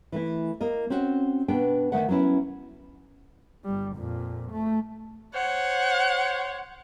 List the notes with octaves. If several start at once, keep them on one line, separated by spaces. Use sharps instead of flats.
E3 A3 E4
A#3 D#5
C4 C#4 F#4
B2 B3 D4 G5
D2 B2 D#3 A3 E5 F#5
F#3 B3 C#4 E4
G1 G3
F2 A#2
A3
C5 C#5 F#5